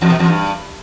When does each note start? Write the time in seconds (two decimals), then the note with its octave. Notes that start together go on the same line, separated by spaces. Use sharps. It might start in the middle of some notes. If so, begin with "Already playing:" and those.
0.01 E2
0.10 B2
0.19 E2
0.28 G2